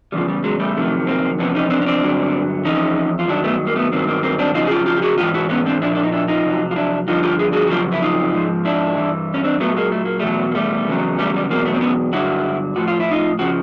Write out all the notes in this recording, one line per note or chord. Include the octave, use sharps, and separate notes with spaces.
E2 C#3 F3 G3
G3
F#3 G#3
G3 A3
F2 C3 D#3 F#3
A#3 C4
F2 C3 E3 B3 C#4
C#4 D#4
C4 D4
C#4
C4 D4
G2 D3 F#3
C3 E3 C#4 D#4
F2
F4
G2 D#3 F#3 D4 E4
A3 B3
A#3
A3 B3
G2 D#3 F#3 A#3 C4
A#3 C4
A#3 C4
C4 D4
F2 C#3 F#3 D#4 F4
G#4
F4 G4
F4 G4
G4
F#4 G#4
G#2 E3 F4 G4
E4 F#4
B3 C#4
C4 D4
A#2 F3 D4 E4
D4
D#4
D4 E4
D#4 F4
F2 C3 F#3
F4
D4 E4
G2 D3 F3 D#4 F4
F4 G4
G#4
F#4 G#4
F#4
F2 C#3 F#3 F4 G4
E4
D#4 F4
G#2 F3
D4 E4
G2 E3
C#4
C4 D4
A#2 F#3 A3 B3
G#3 A#3
A3
A#3
E2 B2 F#3 G3 A3
A#3
G3 A3
E2 C#3 F#3
G3 A3
G3
E2 B2 F#3 A#3 C4
A3 B3
C4
B3 C#4
G2 D3 F#3 E4 F#4
A2 F3 F#4
F4
E4
D#4 F4
C#3 F3 F#4